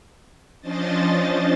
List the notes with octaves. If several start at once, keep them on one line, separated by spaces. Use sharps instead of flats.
F3 C#4 D4 C5 D#5 A6